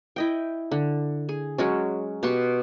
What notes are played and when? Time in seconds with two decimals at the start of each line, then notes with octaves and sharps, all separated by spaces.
0.16 E4 D#5 G5
0.71 D3
1.29 G#4
1.58 F#3 G#3 C#4
2.23 B2 G4 C6 C#6